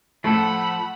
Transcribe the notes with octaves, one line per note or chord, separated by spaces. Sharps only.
A2 F3 A3 A4 F#5 B5